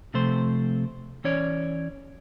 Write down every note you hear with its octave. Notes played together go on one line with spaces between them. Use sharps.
C3 F3 A3 C4 C5
E3 C#4 C#5 D5